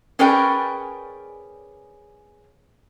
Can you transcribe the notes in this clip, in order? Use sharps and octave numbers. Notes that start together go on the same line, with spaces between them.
C#4 G#4 A#4 B4 D5 G5